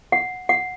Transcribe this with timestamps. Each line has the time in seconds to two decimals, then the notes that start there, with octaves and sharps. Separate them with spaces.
0.12 F#5
0.49 F#5